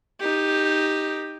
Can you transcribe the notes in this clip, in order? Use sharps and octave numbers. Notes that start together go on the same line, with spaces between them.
D#4 G4